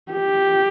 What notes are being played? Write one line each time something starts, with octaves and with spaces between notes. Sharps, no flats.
G4